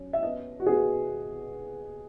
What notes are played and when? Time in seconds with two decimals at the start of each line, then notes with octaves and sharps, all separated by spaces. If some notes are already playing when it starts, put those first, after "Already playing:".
Already playing: F#3 C#4
0.13 E5
0.23 B3 D#5
0.60 F#4
0.66 B3 G#4